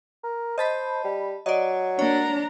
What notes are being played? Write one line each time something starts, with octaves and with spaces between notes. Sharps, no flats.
A#4
C5 D#5 A5 B5
G3
F#3 D5 D#5
A#3 D4 C#5 A#5